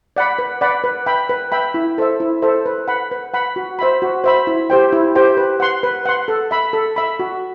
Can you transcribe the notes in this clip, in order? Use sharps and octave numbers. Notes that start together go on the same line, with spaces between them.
D5 F#5 B5
B4
D5 F#5 B5
B4
E5 G5 B5
B4
E5 G5 B5
E4
A4 C5 E5
E4
A4 C5 E5
B4
F#5 B5
B4
F#5 B5
F#4
C5 E5 B5
F#4
C5 E5 B5
E4
G4 C5 G5
E4
G4 C5 G5
B4
F#5 C6
B4
F#5 C6
A4
E5 B5
A4
E5 B5
F#4